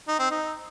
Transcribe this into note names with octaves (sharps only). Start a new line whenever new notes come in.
D#4
C4
D#4